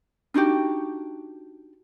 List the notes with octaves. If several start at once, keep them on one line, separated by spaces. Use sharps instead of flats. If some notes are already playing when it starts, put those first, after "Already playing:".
D4 D#4 F#4 G4